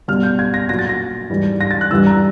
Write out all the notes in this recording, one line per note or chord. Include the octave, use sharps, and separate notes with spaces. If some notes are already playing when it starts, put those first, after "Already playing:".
B2 G3 F6
G6
G#6
A#6
A#2 F#3 A#6
A6
A#6
G#2 E3 G3
A#6
A6
F#6
G2 E3 G3 E6
A#5